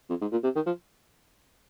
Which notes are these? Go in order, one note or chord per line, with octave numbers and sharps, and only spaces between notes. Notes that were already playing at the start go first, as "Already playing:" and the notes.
F2
G#2
A#2
C3
D#3
F3